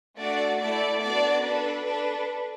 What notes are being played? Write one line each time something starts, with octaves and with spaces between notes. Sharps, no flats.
A3 D4 F#4 D5
A3 E4 A4 D5
B3 D4 F#4 A4 D5
D4 A4 B4
D4 A4 B4